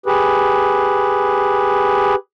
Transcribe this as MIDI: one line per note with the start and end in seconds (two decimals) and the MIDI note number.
0.06 2.15 67
0.06 2.15 68
0.06 2.15 71